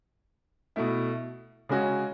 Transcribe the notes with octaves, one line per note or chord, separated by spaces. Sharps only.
B2 A3 E4
C#3 G#3 C#4 F#4